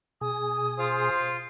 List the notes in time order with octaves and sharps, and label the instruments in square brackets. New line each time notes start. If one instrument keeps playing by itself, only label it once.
[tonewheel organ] B2 G#4 G#5 [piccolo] D#6
[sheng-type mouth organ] F4 F5 [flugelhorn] C5